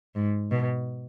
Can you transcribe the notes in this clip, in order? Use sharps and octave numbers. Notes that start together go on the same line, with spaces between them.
G#2
B2